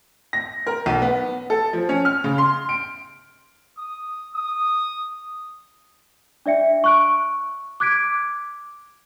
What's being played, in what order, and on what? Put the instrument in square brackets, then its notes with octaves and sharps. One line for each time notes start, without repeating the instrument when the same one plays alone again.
[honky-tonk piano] A#6
A#4
B1
B3
A4
F3
C#4
F6
C#3
C6
D7
[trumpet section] D#6
D#6
[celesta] D4 D5 E5 C#7
C#6 F#6 D7
D6 F#6 G#6 B6 D7